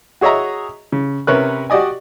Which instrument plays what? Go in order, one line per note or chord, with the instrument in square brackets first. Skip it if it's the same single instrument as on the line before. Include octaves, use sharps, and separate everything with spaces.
[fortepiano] F#4 G#4 C#5 D#5 E5 A#5
C#3
C3 C#4 A#4 B4 C#5 F#6
F#4 G4 D5 D#5 G#5